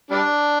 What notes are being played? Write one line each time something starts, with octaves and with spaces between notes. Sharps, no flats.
G3 D4